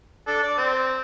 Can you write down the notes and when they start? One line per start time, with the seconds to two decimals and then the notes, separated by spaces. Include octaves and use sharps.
0.27 D4 A4
0.43 D5
0.58 C4